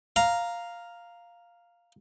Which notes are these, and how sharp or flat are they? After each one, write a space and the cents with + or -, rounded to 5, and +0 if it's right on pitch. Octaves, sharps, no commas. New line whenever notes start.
F5 +0 A#5 +0